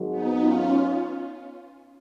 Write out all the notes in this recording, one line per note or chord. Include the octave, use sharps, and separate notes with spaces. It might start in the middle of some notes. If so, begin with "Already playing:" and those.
Already playing: G#1 G#2 F#3
B3 D#4
C#4 F4